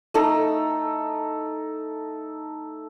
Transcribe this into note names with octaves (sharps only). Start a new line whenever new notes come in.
A3 D#4 A4